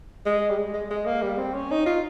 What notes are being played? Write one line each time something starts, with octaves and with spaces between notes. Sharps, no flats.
G#3
G3
G#3
G#3
G#3
A#3
G3
C4
C#4
D#4
F4